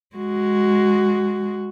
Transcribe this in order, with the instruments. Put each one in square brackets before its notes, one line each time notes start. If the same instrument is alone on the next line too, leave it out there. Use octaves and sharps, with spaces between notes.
[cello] G#3 F#4